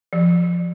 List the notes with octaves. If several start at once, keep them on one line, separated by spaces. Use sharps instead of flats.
F3